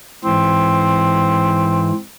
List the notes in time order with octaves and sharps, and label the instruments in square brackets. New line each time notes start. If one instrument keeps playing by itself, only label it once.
[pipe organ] G#2 E3 [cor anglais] C4